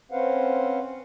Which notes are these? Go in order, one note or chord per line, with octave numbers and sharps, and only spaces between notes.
C4 C#4 B4 C5 F5 F#5